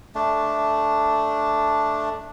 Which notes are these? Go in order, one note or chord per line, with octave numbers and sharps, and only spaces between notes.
A3 D4